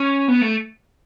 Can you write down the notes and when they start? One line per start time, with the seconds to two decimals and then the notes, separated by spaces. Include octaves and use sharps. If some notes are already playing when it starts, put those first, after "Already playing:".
Already playing: C#4
0.28 B3
0.42 A3